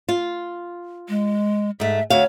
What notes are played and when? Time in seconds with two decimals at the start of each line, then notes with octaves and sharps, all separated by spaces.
0.09 F4
1.09 G#3
1.80 G#2 A3 E5
2.10 D2 F#4 C#5 F5